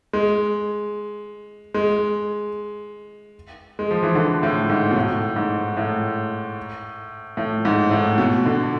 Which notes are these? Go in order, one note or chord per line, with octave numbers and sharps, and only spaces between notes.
G#3
G#3
G#3
F3
E3
D3
A2
G#2
B2
A2
G#2
A2
A2
G#2
A2
B2
D3